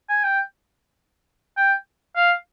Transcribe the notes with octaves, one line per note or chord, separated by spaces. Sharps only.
G#5
G5
G5
F5